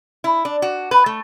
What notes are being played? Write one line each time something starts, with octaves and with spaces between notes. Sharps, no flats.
E4
D4
F#4
B4
A3